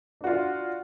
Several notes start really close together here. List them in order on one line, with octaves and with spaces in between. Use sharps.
D4 F#4 F4